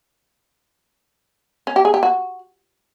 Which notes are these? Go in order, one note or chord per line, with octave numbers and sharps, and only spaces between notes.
C#4
G4
G#4
G4
F#4